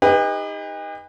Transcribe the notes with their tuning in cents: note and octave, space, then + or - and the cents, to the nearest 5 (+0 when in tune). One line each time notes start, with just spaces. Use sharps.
D#4 +10 G4 +45 B4 +0